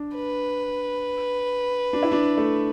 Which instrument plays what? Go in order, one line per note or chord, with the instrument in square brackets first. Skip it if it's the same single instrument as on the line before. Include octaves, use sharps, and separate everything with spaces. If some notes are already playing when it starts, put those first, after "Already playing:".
Already playing: [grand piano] D4
[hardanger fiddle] B4
[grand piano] D4
E4
D4
A3